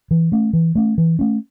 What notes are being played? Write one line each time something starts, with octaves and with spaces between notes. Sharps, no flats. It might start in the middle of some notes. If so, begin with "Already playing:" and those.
E3
A3 C#4
E3
A3 C#4
E3
A3 C#4